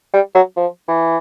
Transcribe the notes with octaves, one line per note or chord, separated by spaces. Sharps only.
G3
F#3
F3
E3